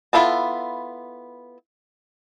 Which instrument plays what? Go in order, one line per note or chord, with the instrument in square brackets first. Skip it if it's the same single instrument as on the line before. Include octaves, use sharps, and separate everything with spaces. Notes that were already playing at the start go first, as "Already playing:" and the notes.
[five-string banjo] B3 E4 F4 A4 A5